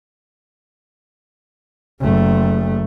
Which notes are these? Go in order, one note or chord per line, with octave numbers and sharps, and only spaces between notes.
F#1 A3